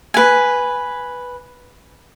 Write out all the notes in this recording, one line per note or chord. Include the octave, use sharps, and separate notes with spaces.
B4 G#5